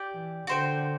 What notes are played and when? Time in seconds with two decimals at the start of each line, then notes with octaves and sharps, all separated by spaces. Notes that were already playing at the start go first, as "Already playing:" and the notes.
Already playing: G4 D5 G5
0.13 E3
0.47 D3 F#4 C5 G5